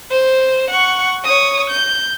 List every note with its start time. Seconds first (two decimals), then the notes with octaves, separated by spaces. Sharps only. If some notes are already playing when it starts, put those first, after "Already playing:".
0.11 C5
0.70 F#5 C#6
1.24 C#5 D#6
1.70 G6